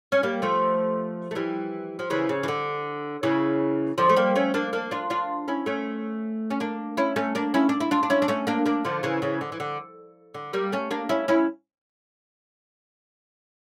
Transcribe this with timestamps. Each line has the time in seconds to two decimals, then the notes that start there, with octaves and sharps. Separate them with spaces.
0.12 C#4
0.23 G3 A#3
0.42 F3 A3
1.31 A3
1.35 E3 G3
1.99 F3
2.10 C#3 E3
2.29 C#3
2.43 E3
2.48 D3
3.23 C#3 E3
3.98 D3 F3
4.09 A3
4.16 G3 A#3
4.35 A3 C#4
4.54 A#3 D4
4.73 A#3 D4
4.91 D4 F4
5.10 D4 F4
5.48 C#4 E4
5.66 A3 C#4
6.50 C#4
6.60 A#3 D4
6.97 C#4 E4
7.16 A3 C#4
7.35 A#3 D4
7.54 C#4 E4
7.69 D4
7.80 E4
7.91 D4 F4
8.03 D4
8.10 C#4 E4
8.22 D4
8.28 A3 C#4
8.47 A#3 D4
8.66 A#3 D4
8.85 D3 F3
9.03 C#3 E3
9.22 C#3 E3
9.41 D3
9.52 E3
9.60 D3
10.34 D3
10.53 G3 A#3
10.72 A3 C#4
10.91 A#3 D4
11.09 C#4 E4
11.28 C#4 E4